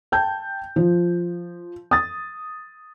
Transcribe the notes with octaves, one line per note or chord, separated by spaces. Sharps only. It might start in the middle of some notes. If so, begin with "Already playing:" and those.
G5 A5 G6
F3
D#6 A6